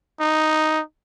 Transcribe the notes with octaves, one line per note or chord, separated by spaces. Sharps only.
D#4